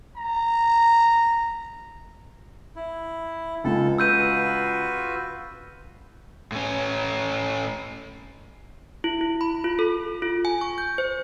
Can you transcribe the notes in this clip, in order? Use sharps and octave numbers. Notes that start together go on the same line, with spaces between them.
A#5
E4
C#2 C#3 G#3 A4
F4 F#4 B4 E6 G6 D#7
A2 C#4
E4
E4
B5
F4
A4
F4
G#5
C#6
G6
C5